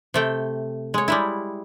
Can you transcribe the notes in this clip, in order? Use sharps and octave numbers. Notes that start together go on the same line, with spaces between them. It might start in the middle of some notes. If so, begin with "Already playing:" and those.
C3 A3 G5
G#3 C#5
G3 G#3 E4